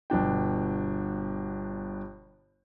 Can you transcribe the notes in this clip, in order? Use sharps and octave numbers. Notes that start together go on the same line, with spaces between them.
G1 B2 D4 G5